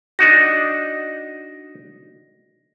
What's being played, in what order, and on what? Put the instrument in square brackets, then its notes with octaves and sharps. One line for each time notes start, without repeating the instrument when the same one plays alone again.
[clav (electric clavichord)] D4 D#4 F#4 [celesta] A#6